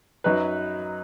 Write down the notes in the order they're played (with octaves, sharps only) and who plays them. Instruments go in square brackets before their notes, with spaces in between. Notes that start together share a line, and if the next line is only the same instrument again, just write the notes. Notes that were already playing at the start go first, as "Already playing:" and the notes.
[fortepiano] F#2 F#3 D#4 B4